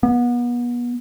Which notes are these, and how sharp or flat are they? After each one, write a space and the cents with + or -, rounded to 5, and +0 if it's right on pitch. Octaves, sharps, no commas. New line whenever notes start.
B3 -35